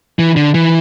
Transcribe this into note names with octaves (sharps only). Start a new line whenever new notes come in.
E3
D3
E3